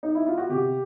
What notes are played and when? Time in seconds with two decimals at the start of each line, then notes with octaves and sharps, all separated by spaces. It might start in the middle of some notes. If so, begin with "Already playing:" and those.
0.03 D#4
0.15 E4
0.26 F4
0.38 F#4
0.49 C3 G4